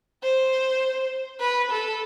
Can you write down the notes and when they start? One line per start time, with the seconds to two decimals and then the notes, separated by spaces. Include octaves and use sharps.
0.23 C5
1.40 B4
1.71 A4